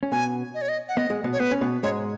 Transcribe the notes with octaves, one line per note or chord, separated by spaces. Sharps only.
C#4
B2 B3 G#5
D#5
C#5
D#5
F#5
B3 D#5
G#3
B2 B3
C#5
B3 B4
C#4
B2 B3
G#2 G#3 C#5